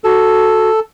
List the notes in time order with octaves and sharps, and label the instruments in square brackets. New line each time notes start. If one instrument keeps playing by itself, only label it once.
[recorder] F#4 [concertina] A4